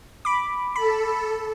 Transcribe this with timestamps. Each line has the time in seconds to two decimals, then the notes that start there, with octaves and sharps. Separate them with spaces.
0.25 B5 D6
0.76 A4 B5